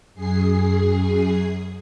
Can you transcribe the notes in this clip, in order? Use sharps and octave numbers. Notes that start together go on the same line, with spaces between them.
F#2 G#4 C7